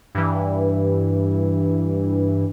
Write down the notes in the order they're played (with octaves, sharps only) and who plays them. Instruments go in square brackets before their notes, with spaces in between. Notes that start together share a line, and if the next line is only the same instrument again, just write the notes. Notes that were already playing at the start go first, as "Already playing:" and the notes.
[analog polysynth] G2 E3